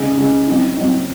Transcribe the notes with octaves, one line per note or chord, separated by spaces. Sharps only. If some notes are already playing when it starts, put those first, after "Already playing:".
Already playing: C#3 G#3 D#4 G#4
C#3 G#3 D#4 G#4
F#3 C4 D#4
F#3 C4 D#4